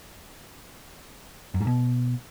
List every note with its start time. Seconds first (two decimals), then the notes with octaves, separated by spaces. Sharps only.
1.54 F#2
1.61 G#2
1.67 B2